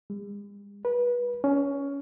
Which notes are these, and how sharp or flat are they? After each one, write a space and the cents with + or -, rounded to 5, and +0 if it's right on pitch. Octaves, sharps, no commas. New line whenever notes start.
G#3 -45
B4 -25
C#4 +15